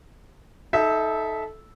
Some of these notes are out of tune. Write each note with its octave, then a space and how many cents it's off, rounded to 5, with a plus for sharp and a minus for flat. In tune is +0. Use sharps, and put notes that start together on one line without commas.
D#4 +15 A4 -15 E5 -10